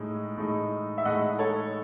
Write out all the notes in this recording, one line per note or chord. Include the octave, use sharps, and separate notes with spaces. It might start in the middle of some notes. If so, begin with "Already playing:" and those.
Already playing: A2 G#3 D#4
A2 G#3 D#4
E5
A2 G#3 D#4 D#5 F#5
A4 C#5